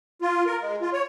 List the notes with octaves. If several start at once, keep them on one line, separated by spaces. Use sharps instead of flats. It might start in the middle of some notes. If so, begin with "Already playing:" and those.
F4
A#4
G#3
F4
C#5